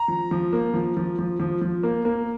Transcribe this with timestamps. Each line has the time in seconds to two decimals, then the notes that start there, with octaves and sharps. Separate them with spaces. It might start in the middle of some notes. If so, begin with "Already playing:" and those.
Already playing: A#5
0.08 F3
0.31 F3
0.53 A#3
0.74 F3
0.97 F3
1.19 F3
1.40 F3
1.61 F3
1.83 A#3
2.05 A#3